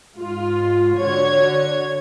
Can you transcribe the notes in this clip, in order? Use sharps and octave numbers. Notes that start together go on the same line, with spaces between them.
G#2 F4
D3 F#4 C#5 G#6